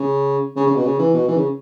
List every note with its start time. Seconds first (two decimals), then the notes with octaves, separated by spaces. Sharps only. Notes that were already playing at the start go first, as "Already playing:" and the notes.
Already playing: C#3
0.56 C#3
0.67 C#3
0.76 B2
0.85 C#3
0.99 E3
1.14 B2
1.28 E3
1.36 C#3